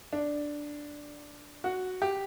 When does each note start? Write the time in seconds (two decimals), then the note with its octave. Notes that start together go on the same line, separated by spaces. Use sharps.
0.13 D4
1.64 F#4
2.02 G4